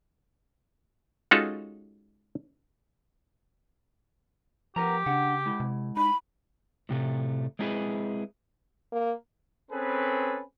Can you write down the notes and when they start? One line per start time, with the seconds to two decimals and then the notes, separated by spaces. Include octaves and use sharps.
1.31 G#3 C#4 D#4 F4 F#4 A4
4.76 F3 B3 G4 A#4 A#5
5.06 C#3 D4 F#5
5.46 G#3 E4
5.60 C3
5.97 D#4 B5
6.89 A2 C3 A3
7.59 G#3 C4 D4 E4 G#4 B4
8.92 A#3
9.71 C4 C#4 G#4 A4 B4